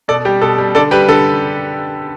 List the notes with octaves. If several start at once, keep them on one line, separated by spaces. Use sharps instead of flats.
B2 A4 D5
G3 G4
B2 A4
G3
D3 A4 D5
G3 G4 B4
D3 A4